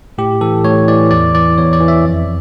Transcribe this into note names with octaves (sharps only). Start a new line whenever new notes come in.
A2 G4
E3 A4
A2 C#5
E3 D5
E2 D5
E3 D5
E2 C#5
D5
E3
E5
F2